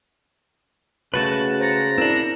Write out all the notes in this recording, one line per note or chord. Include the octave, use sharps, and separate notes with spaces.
C#3 A3 F#4 B4 A5
C5 A#5 A6 C#7
C4 D4 E4 A#4